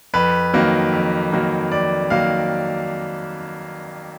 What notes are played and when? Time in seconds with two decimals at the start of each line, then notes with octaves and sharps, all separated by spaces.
0.14 F2 B4
0.54 D#3 F#3 A#3
0.92 F2
1.32 D#3 F#3 A#3
1.71 F2 D5
2.10 D#3 F#3 A#3 F5